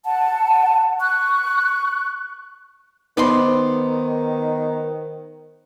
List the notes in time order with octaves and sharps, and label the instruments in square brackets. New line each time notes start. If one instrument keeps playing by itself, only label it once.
[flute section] F#5 A5
C#6 F#6
[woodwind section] D#3 [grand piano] B3 [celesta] D#4 C5 [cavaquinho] D5 B5 C6